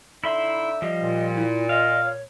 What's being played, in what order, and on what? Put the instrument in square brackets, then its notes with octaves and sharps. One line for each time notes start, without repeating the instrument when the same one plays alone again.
[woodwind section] D3 D#4 E5 [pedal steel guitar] E4 B5 C6
[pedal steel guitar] F3 G3 [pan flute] D#5
[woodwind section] A#2
[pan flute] E4
[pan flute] D#5 [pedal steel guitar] F5
[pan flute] C#5